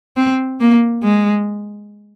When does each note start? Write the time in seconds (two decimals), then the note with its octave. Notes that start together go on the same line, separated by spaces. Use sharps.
0.17 C4
0.60 A#3
1.03 G#3